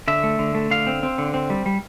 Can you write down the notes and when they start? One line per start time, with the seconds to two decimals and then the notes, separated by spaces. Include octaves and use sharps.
0.08 D3 E5
0.23 A3
0.39 D3
0.55 A3
0.71 D3 F5
0.87 C4
1.03 C4
1.18 D3
1.34 C4
1.50 G3
1.66 G3